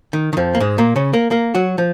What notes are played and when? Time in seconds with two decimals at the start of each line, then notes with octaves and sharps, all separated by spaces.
0.13 D#3
0.33 D#3
0.37 F2 F3
0.55 A#3
0.60 G#2 G#3
0.78 A#2 A#3
0.96 C#3 C#4
1.13 A#3 A#4
1.31 A#3 A#4
1.55 F#3 F#4
1.78 F3